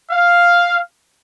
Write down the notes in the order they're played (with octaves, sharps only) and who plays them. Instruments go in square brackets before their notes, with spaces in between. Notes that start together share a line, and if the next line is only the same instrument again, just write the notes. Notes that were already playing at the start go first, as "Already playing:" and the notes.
[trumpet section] F5